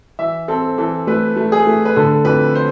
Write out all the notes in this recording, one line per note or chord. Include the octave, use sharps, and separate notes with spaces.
E3 E5
C4 A4
E3 A4
A3 B4
A3
G#4
A3
B4
D3 A4
F2 B4
C5